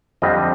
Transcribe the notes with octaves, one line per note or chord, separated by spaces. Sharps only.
F2 D3 G3 C4 D#5